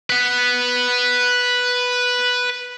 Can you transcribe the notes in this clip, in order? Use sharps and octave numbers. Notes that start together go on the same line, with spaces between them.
B4 F#5